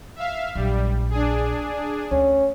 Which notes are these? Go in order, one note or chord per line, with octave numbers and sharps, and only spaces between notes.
E5 F5
A#1 F#3 G3
D4 G#4
D2 C#4